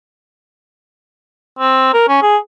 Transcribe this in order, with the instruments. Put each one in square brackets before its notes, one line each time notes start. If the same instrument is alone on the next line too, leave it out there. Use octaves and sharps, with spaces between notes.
[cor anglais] C4
A#4
C#4
G#4